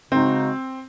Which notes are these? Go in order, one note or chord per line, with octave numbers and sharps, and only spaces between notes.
C#3 G#3 C4 D#4 F#4